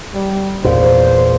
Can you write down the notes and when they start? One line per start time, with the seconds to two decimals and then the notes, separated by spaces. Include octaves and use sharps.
0.14 G3
0.64 E2 A#2 C5